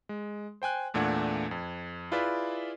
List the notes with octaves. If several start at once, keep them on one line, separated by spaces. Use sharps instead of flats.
G#3
C5 G5 G#5 F#6
E2 A#2 A3 D4 F#5 G#6
F2
E4 F4 G#4 B4 D5 E5